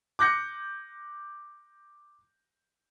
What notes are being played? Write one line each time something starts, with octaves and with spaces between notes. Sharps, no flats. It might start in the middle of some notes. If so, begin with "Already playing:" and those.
D6 F#6 G6 A#6 C#7